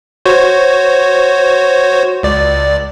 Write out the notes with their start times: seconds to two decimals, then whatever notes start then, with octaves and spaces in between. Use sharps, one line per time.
0.25 F#4 C5 C#5
2.23 C#2 D5